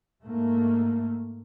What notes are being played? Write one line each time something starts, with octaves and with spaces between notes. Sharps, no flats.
G#2 A3 A#3